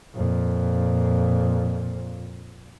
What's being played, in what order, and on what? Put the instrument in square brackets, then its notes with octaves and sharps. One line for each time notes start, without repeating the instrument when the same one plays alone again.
[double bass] F2 A#2